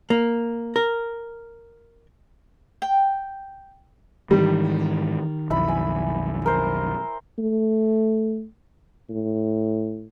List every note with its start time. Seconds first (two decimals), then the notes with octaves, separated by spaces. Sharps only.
0.10 A#3
0.76 A#4
2.82 G5
4.31 G#2 D#3 E3 G3
5.50 B1 F2 E4 B5
5.68 G#5
6.46 A#4 C5
7.39 A3
9.09 A2